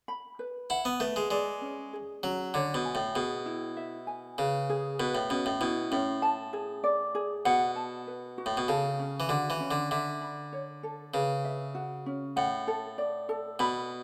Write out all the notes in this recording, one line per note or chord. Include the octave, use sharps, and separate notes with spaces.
B5
B4
E4 F#5
B3
A3 B4
G#3
G#3 D5
C#4
G#4
F#3 C#4
D3 C#5
B2
G#5
A2
B2 G#4
E4
E5
G#5
C#3 B4
G#4
B2 B4
A2
B2 C#4
A2
B2 E4
A2 C#4
A5
G#4
D5
G#4
B2 F#5
A5
B4
F#4
A2
B2
C#3 A4
C#4
E3
D3 F#4
E3
C#4
D3
D3 E5
B5
C#5
A4
C#3 B4
E5
F#4
C#4
A2 F#5
A4
D5
A4
B2 B5